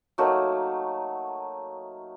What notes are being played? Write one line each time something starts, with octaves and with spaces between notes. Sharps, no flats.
F#3 A3 A#3 D#4